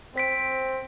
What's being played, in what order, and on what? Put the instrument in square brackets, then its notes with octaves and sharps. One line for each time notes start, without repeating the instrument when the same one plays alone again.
[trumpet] C4 [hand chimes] C5 B6 D7